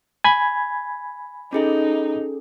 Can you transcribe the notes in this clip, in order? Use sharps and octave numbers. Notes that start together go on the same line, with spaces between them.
G#5 B5 G#6
C#4 D#4 G#4 A4